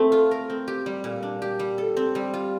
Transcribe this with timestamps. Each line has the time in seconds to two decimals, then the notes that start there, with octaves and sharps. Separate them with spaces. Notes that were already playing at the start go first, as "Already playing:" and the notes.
Already playing: A3 C4
0.12 F4
0.31 A#4
0.50 C4
0.68 G4
0.86 G3
1.04 A#2
1.23 D4
1.42 G4
1.59 G3
1.78 A4
1.97 C4
2.15 G3
2.34 F4